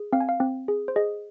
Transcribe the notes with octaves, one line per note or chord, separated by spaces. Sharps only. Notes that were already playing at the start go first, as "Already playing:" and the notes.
Already playing: G#4
C4 F5
G#5
F5
C4
G#4
C5
G#4 D#5